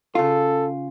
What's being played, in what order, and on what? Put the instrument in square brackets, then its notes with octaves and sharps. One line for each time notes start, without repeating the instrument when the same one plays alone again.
[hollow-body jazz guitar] C#3 F4 [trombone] A4